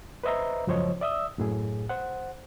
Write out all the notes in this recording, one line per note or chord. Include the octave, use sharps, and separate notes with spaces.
B4 C5 D#5 E5 A#5
C#2 F#2 F3 C5 C#5 D#5
D5 E5 D#6 E6
F#2 A2 G#4
C5 F#5